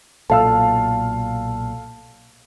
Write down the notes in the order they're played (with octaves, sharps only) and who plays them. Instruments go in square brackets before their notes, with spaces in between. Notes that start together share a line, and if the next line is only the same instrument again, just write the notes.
[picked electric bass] B1 A#2 [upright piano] A4 F5 E6 [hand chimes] A5